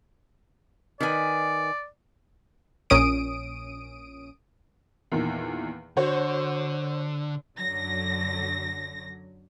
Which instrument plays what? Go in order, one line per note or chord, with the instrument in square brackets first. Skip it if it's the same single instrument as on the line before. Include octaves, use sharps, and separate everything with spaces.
[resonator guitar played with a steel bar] D#3 B4 G#5 [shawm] D5
[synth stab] A#1 A#2 C#4 D#6 D7 D#7
[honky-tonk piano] E2 A#2 D#3
[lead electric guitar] D3 [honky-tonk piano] F#4 C5 C#5
[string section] F#2 D3 F#3 A#6